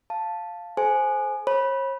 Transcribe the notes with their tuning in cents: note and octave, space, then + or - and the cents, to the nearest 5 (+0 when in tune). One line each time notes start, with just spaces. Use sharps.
F5 +0 A5 +0
A4 -35 C5 +0 G#5 +15
C#5 -45 B5 -15